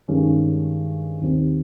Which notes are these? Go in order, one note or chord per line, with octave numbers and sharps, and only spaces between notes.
G2 D#3 G#3 C#4
D#2 D#3 G3 C4